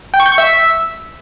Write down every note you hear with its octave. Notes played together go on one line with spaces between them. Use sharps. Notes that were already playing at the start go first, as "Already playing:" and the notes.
G5
C#6
G6
C#6
E5